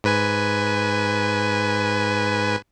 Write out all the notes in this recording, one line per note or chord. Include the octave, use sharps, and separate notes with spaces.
G#2 B4 G#5